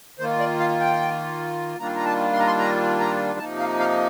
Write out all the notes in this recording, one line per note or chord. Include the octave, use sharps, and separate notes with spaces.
D#3 A#3 F4 C5
D5
F5
G5
D#3 G3 A#3 D4 F4 A#5
A#5
A5
C6
A#5
C6
A#5
A#5
C3 F3 A#3 D#4 A5
F5
F5